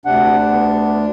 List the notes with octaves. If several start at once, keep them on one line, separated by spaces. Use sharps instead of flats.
D2 C3 D4 F#5
B3